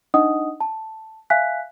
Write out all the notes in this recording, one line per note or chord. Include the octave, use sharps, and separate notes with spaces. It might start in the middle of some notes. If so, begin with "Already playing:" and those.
D4 D#4 D#5 F#5 D#6
A5
E5 F5 G#5 F#6 B6